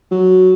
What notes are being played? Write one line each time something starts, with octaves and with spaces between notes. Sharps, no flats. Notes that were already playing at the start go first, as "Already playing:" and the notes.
F#3